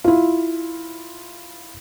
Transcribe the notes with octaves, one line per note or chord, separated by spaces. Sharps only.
E4 F4